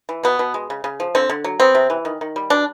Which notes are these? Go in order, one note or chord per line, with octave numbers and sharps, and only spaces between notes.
E3
B2 B3
B2
G#3
C#3
C#3
F3
D3 C4
D3
F#3
B3 C4
C3
E3
D#3
D#3
G3
B2 D4